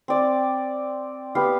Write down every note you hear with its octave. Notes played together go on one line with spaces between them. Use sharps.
C4 D5
B3 G4 B4 F5